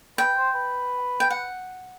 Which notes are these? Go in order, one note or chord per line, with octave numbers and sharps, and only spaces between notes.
B4 G5
C5
B4
G5
F#5